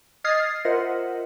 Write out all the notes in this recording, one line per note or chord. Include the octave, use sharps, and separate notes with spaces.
D#5 D#6 F6 G#6 A6 C7
F4 A#4 C5 D#5 E5 F#5